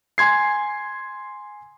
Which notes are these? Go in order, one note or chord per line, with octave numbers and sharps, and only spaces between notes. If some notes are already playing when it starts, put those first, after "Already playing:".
G#5 C6 G#6 C7